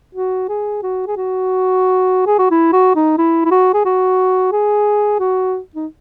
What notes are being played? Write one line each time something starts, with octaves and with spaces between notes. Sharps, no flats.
F#4
G#4
F#4
G#4
F#4
G#4
F#4
E4
F#4
D#4
E4
E4
F#4
G#4
F#4
G#4
F#4
D#4